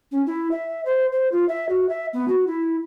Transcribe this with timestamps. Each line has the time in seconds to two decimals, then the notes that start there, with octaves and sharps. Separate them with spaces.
0.12 C#4
0.26 E4
0.51 E5
0.85 C5
1.12 C5
1.31 F4
1.48 E5
1.69 F#4
1.89 E5
2.13 B3
2.28 F#4
2.47 E4